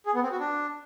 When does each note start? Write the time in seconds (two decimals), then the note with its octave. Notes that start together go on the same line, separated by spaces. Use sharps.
0.06 G#4
0.14 B3
0.23 C4
0.31 F#4
0.40 D4